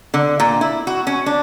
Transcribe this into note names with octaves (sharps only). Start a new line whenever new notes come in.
D3
A#2
E4
F#4
C#4
D4